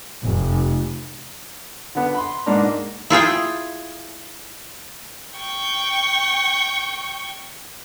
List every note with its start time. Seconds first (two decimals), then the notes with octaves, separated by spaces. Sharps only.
0.23 F1
1.95 D3 B3
2.14 B5 C6
2.46 G#2 B2 A#3 D4 A#5
3.10 E4 F4 G#4 G5
5.38 G5 C#6